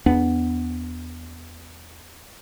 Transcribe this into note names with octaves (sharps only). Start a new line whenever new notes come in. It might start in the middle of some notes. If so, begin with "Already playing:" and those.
E2 B3 D4